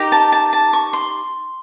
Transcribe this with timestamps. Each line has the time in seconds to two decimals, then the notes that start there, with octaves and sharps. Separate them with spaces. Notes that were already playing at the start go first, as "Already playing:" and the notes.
Already playing: D#4 G4 A#4
0.12 A5
0.32 A5
0.53 A5
0.73 C#6
0.93 C6